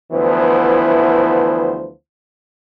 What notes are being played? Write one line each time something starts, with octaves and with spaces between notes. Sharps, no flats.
D2 E3 F3 B3 E4 C5